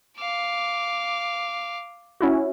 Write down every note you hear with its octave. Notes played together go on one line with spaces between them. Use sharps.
F5 D6
C#4 E4 F#4